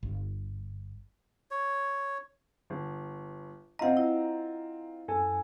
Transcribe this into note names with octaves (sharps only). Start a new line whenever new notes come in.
G1
C#5
G1
C4 F4 D#5 F#5 A#5
E4
F#2 A4 G#5